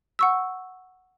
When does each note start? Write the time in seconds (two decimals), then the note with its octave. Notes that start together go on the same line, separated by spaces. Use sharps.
0.19 F#5 C#6 E6